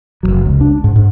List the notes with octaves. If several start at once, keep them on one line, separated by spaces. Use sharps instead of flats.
F1 D#2 F#3
C#2
D4
G#2
G#2